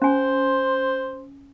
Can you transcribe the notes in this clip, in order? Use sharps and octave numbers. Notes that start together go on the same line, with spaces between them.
C#4 C5 G#5